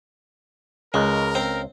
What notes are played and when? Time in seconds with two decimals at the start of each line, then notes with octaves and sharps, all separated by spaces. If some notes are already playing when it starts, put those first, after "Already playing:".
0.94 C#2 G#3 A#4
1.35 C4